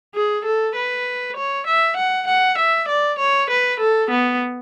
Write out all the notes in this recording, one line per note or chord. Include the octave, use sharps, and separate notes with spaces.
G#4
A4
B4
C#5
E5
F#5
F#5
E5
D5
C#5
B4
A4
B3